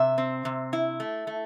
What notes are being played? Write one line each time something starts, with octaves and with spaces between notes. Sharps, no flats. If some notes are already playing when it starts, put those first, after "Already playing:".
Already playing: C3 E5
C4
C3
E4
A3
A3